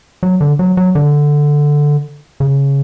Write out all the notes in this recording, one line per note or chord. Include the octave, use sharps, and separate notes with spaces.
F#3
D3
F#3
F#3
D3
C#3